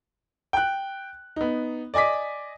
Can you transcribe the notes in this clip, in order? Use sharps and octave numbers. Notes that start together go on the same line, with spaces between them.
G5 F#6
B3 D#4
D5 D#5 G#5 D6 B6